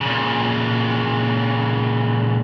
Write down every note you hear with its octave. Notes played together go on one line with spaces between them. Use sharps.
A#2 C#3